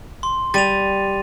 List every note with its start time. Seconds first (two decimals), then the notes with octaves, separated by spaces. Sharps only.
0.23 C6
0.54 G3 A6 D#7 F7